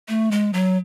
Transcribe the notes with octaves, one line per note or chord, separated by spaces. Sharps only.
A3
G#3
F#3